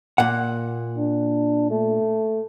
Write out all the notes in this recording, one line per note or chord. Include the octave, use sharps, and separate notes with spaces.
A#2 F#5
D4
A3